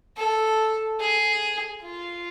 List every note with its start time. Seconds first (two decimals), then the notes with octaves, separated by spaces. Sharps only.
0.17 A4
1.00 G#4
1.82 F4